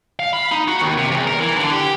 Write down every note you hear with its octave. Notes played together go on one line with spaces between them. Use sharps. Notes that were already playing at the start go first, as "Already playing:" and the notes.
F5
B5
D#4
F#4
D#2
C3
E2
A#4
E3
D3
G4